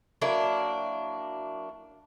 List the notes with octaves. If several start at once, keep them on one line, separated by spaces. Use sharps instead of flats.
F#3 A#3 D4 E4